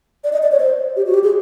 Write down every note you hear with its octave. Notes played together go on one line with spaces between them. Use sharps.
D5
D#5
D5
C#5
C5
G4
F#4
G4
G#4